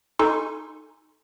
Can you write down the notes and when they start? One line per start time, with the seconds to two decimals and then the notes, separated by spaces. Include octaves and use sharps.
0.19 D#4 A4 G#5 C6 C#6